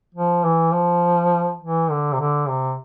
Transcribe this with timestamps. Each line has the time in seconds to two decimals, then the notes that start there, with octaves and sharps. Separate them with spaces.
0.15 F3
0.44 E3
0.73 F3
1.62 E3
1.91 D3
2.13 C3
2.20 D3
2.49 C3